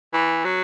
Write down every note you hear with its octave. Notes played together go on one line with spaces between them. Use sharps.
E3
F#3